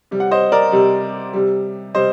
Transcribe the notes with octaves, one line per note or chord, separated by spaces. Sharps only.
C3 G3
F#5
C5 D#5
A#4 D5
C3 G3
C3 G3
C3 G3 C5 D#5